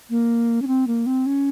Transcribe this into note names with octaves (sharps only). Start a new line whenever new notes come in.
A#3
C#4
C4
A#3
C4
C#4